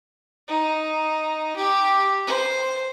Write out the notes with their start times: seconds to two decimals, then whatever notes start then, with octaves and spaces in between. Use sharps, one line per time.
0.48 D#4
1.56 G4
2.27 C5